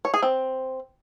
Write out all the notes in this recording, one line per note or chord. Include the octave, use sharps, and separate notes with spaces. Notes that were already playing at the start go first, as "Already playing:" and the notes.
C#5
G#4
C4